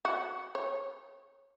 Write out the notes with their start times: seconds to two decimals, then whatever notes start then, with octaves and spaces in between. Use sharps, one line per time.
0.05 F#4
0.55 C#5